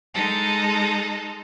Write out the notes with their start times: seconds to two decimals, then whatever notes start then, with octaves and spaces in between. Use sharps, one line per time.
0.13 G#3 D#4 A4